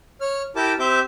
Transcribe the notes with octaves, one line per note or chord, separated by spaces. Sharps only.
C#5 F6
E4 G4 A#4 G5 A5 D6
C4 G4 C5 E5 D6 G6